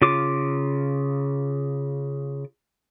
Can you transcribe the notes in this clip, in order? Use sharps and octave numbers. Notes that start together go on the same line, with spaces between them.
C#3 F4 D6